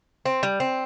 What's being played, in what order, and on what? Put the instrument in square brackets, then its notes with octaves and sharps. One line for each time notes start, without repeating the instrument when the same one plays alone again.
[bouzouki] C4
G3
C4